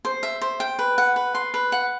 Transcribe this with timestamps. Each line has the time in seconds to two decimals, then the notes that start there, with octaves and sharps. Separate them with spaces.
0.05 C5
0.23 E5
0.41 C5
0.60 G5
0.79 B4
0.98 F#5
1.16 B4
1.35 C6
1.54 B4
1.72 F#5